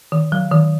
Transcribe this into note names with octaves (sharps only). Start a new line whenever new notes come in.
D#3
F#3
D#3